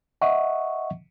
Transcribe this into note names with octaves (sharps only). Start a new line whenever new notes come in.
D#5 E5 F#5 C#6